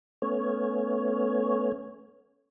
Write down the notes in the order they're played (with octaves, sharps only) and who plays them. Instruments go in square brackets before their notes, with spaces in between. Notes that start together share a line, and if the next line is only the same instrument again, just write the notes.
[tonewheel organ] A3 B3 C#4 C#5